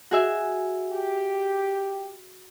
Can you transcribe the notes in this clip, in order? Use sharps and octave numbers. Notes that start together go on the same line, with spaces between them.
F#4 G#4 E5
G4